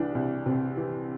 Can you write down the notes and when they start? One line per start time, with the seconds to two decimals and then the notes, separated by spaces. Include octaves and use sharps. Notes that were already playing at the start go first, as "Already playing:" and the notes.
Already playing: C2 E3 D4
0.15 C2
0.46 C3
0.77 E3